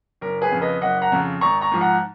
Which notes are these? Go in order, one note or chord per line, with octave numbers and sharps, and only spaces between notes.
F#1 A#4
G#4 B4
F2 C#3
B4 D#5
F#1 D#5 F#5
F#5 A#5
F2 C#3
G#1 A#5 C#6
A#5 C#6
G#2 F3
F#5 A#5